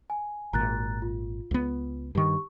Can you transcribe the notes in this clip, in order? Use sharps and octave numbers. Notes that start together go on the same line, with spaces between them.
G#5
G#1 A#2 A#5 F#6 A6
F4
C#2 B3
G2 D#3 G4 C#6